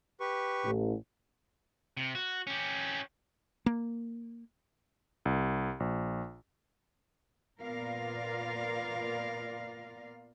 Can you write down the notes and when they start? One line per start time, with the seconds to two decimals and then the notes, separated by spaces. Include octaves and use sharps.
0.20 G4 B4 C#6
0.64 A1
1.97 C3
2.15 F#4
2.47 C#4 G4
3.66 A#3
5.25 C2
5.80 A#1
7.61 A#2 B3 F4 A#4 D5 F5